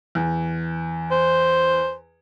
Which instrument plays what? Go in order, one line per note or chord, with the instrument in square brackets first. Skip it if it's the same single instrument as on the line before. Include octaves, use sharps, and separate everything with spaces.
[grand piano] E2
[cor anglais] C5